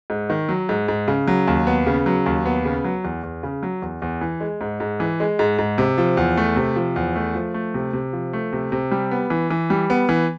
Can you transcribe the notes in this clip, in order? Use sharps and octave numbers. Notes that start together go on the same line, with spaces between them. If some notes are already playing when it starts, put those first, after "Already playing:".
G#2
D#3
F#3
G#2
G#2
C#3
F#3
D#2
B3
C#3
F#3
D#2
B3
C#3
F#3
E2
E2
C#3
F#3
E2
E2
E3
G#3
G#2
G#2
E3
G#3
G#2
G#2
C3
F3
E2
A3
C3
F3
E2
A3
F3
A3
C3
C3
F3
A3
C3
C3
G3
B3
E3
E3
G3
B3
E3